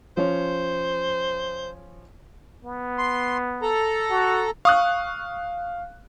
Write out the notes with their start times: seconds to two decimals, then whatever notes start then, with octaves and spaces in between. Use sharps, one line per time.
0.17 F3 C#4 C5 C#5
2.65 B3
2.98 C6
3.62 A4 A#5
4.10 F#4
4.65 F5 C#6 D#6 F#6